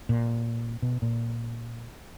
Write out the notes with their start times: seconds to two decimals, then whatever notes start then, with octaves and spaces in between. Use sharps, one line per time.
0.09 A#2
0.82 B2
1.02 A#2